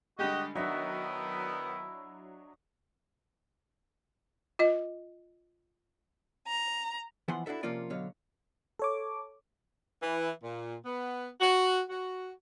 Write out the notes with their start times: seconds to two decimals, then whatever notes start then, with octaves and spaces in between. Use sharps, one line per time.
0.19 D3 G3 G#3 F#4 G4 D#5
0.55 D#3 F#3 B3 D4 E4 F#4 D#5 E5
4.59 F4 D#5
6.47 A#5
7.28 E3 F3 B3 E4 F#5 C6
7.46 D4 E4 F#4 A4 E5
7.63 C3 F3 A#3 C#4 F4 D5
7.90 B2 D3 F#3 C#5 F5
8.79 A4 C#5 D6
10.03 E3
10.43 A#2
10.86 B3
11.41 F#4
11.90 F#4